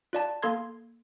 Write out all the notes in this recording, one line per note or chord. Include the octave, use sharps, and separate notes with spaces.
F4 D5 A5
A#3 A4 C6 G#6